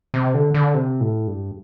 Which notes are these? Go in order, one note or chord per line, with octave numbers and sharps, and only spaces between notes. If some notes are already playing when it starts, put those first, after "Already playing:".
C3
D3
D3
C3
A2
G2